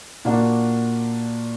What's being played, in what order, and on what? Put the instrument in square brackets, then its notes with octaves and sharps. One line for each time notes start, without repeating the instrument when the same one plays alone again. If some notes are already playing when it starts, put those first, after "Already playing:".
[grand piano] A#2 A#3 D4 F#4